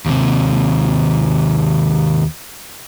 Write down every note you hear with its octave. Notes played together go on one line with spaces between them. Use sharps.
D#2 C3